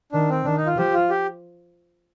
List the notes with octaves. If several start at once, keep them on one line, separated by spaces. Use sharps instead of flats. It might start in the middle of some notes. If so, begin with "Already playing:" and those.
D#3 D4
C4
D#3 D4
D#4
F4
F3 G4
F4
G4